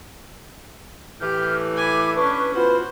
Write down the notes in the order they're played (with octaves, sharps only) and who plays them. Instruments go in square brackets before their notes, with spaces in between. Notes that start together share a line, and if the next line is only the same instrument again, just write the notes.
[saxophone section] A2 E3 [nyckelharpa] G4 [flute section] F6 G6
[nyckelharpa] G#5 B5 [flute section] D6
[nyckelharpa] C#4 D4 [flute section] B4 C#6
[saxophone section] B2 E3 F#4 [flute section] F4 [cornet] B4 [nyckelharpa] C5